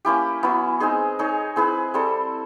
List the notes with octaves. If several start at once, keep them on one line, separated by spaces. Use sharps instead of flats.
A#3 C#4 E4 G4
F#3 B3 E4
G#3 C4 D#4 G#4
D#4 G#4 C#5
C4 E4 G#4 B4
G3 C4 E4 A4